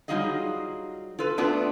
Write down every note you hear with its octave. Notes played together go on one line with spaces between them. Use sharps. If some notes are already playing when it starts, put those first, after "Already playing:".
F#3 G3 D#4 F4 G#4 D#5
F4 A4 B4
A3 B3 D4 F4 B4 D5